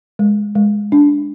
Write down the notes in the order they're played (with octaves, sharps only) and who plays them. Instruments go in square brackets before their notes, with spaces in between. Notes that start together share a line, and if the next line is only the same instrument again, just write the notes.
[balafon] G#3
G#3
D4